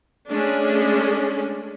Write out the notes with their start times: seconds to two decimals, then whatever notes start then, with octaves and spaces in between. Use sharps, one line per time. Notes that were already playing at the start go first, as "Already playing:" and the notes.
0.30 G#3 A3 C#4 D4